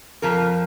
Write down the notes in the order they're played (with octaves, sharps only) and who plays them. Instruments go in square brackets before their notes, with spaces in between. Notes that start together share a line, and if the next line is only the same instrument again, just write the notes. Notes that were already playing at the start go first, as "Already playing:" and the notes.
[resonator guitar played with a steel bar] F2 F3 A#4